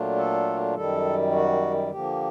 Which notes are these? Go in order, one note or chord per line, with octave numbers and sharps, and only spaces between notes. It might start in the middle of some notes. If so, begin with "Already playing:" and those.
Already playing: A#2 F#3 A3 D4 F4
A4
F#2 D#3 G3 A4
F#4
D3 F3 A#3 G4